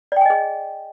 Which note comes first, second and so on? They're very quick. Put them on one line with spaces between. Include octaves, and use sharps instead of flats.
D5 G5 G#5 D#5 G#4